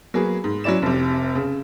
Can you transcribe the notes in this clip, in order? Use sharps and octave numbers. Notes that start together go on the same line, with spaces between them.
F#3 A#3 B3 G#4
G#2
F#3 C#4 E4 D5 E7
F1 C3
C#3